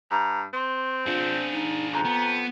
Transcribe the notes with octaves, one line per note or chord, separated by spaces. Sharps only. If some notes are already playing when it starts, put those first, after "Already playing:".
G2 A#5
C4 C6
D4 F4 G#4
D#4
F2 A#5
B3